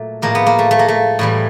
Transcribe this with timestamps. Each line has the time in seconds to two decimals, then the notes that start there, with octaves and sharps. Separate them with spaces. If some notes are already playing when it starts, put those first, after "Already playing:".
Already playing: A#2 F#3 A3
0.22 A2 F3 G#3 A#3
0.35 B3
0.46 A#3
0.59 A3
0.71 A3
0.79 A#3
0.88 A3
1.19 A2 E3 G3